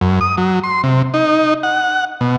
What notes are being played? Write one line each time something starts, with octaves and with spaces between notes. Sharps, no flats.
F#2
D#6
F#3
C6
C3
D#4
F#5
B2